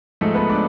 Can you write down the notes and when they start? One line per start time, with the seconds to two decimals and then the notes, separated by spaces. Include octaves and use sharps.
0.21 G#2 F3 G#3 A3 A4
0.35 B3 B4
0.49 D4 D5